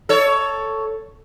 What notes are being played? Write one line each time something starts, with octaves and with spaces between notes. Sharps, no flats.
A4 C#5